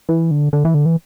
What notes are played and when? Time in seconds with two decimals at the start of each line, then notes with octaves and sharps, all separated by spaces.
0.09 E3
0.31 D3
0.53 D3
0.65 E3
0.74 D3
0.86 E3